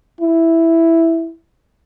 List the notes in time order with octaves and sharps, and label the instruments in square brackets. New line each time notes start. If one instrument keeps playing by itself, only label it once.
[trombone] E4